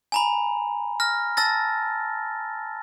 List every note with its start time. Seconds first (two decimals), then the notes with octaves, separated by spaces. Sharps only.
0.12 G#5 A#5 B5
1.00 F6 A#6
1.37 A5 E6 A6 A#6